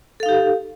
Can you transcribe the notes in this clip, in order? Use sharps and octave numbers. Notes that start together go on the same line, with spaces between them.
D#4 G4 A4 F5